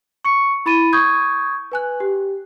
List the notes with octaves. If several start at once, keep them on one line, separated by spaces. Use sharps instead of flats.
C#6 C#7
E4 B5 A6 D#7
C#6 D#6 G6 G#6
B4 G#5 F#6
G4